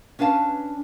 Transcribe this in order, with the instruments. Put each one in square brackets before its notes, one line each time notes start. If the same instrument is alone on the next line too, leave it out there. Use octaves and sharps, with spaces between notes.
[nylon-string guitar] C#4 D4 B4 F5 A5